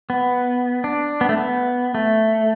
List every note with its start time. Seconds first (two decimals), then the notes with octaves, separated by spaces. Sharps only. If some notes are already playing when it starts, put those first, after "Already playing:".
0.10 B3
0.84 D4
1.21 B3
1.29 A3
1.37 B3
1.95 A3